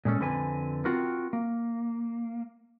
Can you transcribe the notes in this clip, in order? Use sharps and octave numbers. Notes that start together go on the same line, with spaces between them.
A#2 G#3 C#4 A4
F2 D3 C4 B4 G#5
C4 F4 F#4 A#4
A#3